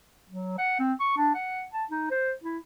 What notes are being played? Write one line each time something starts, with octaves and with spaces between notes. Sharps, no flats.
F#3
F#5
C4
C#6
D4
F#5
A5
D#4
C5
E4